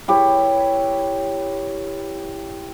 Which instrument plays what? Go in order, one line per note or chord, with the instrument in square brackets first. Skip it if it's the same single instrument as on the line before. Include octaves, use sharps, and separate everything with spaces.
[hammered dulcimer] E4 G4 B4 C#5